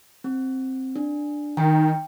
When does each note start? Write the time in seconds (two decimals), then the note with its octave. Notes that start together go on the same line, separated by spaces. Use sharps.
0.24 C4
0.96 D4
1.57 D#3 G5